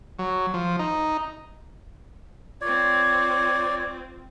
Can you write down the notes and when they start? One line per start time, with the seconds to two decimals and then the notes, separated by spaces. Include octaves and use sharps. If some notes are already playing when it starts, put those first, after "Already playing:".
0.19 F#3
0.54 F3
0.79 D#4
2.61 C4 F4 C#5 D5